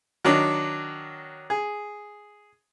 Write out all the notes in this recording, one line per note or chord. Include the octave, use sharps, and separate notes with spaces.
D#3 F#3 D4
G#4